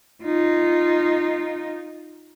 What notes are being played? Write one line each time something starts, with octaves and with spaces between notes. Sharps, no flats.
D#4 F4